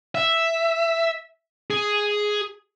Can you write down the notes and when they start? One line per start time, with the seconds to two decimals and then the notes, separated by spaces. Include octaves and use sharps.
0.15 E5
1.70 G#4